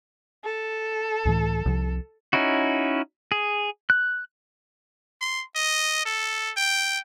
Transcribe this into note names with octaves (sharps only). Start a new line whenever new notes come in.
A4
C#2 A2 E3
C2 C3 F3
C#4 D#4 E4 F#4
G#4
F#6
C6
D#5
A4
G5